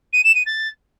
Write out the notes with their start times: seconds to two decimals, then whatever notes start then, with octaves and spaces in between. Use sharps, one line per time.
0.13 D#7
0.24 E7
0.35 D#7
0.46 A6